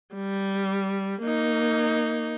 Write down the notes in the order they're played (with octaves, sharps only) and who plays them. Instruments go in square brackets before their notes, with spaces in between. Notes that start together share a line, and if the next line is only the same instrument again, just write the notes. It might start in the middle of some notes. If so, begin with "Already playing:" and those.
[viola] G3
A#3 D#4